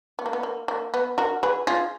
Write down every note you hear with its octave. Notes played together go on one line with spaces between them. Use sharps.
B3
A#3
B3
A#3
A#3
B3
F#4 A#4
G#4 B4
F4 G#4